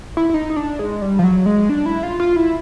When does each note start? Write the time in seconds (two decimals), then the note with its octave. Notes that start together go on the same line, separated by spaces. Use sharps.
0.17 E4
0.30 E4
0.34 D#4
0.50 D#4
0.56 D4
0.79 G#3
1.02 G3
1.19 F3
1.24 F#3
1.46 G#3
1.69 D4
1.86 E4
2.03 F4
2.20 F4
2.36 E4